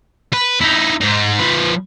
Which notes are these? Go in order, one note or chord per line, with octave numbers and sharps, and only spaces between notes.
B4
D#4 E4
G#2 D#4
F3 B4